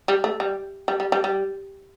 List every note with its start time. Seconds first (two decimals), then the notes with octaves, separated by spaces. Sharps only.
0.08 G3
0.24 A3
0.40 G3
0.88 G3
1.00 G3
1.12 G3
1.24 G3